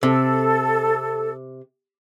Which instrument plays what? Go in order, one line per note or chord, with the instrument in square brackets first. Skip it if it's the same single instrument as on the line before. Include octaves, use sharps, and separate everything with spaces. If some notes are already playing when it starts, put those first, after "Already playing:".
[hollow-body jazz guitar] C3 [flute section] A4